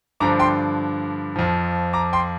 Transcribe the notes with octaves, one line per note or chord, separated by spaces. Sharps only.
G2 D3 F3 A#5 D6
G5 C6
F2 F3
A#5 D6
G5 C6